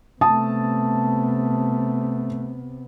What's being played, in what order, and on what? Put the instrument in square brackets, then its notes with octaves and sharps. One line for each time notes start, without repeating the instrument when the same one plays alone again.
[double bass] C3 B3 [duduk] A3 [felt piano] A5 D#6